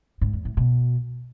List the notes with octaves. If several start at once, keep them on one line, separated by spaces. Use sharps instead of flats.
G#2
E2
A2
B2